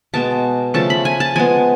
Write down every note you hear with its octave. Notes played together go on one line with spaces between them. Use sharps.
B2 G#3 B3 A5
C#3 F3 A3 A5
B5
G#5
A5
F3 G#3 B3 G#5